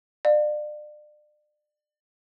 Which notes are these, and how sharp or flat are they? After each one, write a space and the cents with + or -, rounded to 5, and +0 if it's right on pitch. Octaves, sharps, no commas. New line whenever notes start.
D5 +35 F5 +30